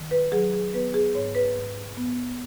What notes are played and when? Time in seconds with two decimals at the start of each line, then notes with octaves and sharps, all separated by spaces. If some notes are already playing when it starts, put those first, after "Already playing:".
Already playing: D#3
0.11 B4
0.32 F#3 G#4
0.53 G#4
0.73 B3 B4
0.94 G#4
1.15 G#2 C#5
1.35 B4
1.56 G#2
1.97 B3